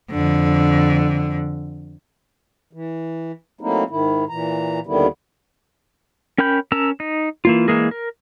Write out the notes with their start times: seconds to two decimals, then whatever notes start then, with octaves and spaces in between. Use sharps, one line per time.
0.11 F2 D3
2.73 E3
3.61 F#3 A3 A#3 C4 D#4 E4
3.90 G#2 D#3 E4
4.29 A#2 E3 A#5
4.87 D#2 D3 D#3 G3 B3 E4
6.38 C#4 A#4 G5 B5 G6
6.72 C#4 A#4 A5 A#5 E6
7.00 D#4
7.45 E3 A#3 F4
7.68 E3 G#3 A#3 G#4 A#4
7.91 A#4